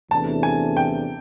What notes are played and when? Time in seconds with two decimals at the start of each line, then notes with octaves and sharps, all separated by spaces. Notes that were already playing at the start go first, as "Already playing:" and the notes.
0.11 E2 C3 E3 A3 D4 A5
0.43 G#5
0.77 G5